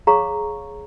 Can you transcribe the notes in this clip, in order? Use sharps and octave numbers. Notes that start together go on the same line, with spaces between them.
G#4 C#5 F5 A#5 C#6